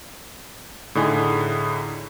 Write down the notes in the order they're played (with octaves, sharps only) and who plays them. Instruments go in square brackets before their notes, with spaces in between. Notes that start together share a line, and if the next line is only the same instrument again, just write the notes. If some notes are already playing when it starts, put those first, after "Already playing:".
[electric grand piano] A2 D3 D#4 G#4